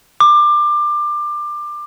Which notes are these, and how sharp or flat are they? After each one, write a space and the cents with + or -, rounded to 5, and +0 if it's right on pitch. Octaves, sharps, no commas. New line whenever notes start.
D6 +20